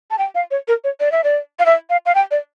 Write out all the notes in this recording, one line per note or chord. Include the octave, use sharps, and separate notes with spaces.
A5
G5
F5
C#5
A#4
C#5
D5
E5
D5
F5
E5
F5
F5
G5
D5